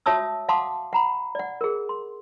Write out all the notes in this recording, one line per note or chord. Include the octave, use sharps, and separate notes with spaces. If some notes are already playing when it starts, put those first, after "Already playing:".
F#4 C#5 E5 A5 D#6 E6
F5 F#5 A5 C6 D6 D#6
F#5 A#5 B5
D5 F#5
G#4 A#4
C6